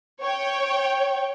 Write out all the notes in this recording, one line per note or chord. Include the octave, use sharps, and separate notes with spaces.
C#5 G5